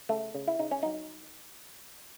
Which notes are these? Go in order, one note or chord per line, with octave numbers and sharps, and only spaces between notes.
C#3 A3
C#3
E4
C#3 D#4
C#4
F#3 D#4